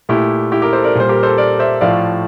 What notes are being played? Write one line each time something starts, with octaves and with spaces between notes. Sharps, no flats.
A#2 A3 E4 G4
E4 G4
G4 A#4
A4 C5
A#4 D5
A#2 G3 C5
G4 A#4
A4 C5
A#4 D5
C5 E5
A2 F3 A3 D5 F5